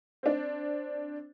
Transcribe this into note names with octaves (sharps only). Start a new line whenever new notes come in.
C4 D4